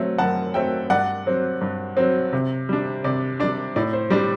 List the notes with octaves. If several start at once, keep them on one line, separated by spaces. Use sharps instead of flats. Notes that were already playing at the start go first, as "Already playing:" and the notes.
Already playing: F#3 A3 C4
F#2 F#5 A5
F#3 A3 C4 E5 G5
G2 D5 F#5
F#3 C4
G2
F#3 C4
C3
G3 D4
C3 D5
G3 D4 D5
A2 D5
C5
G3 D4 D5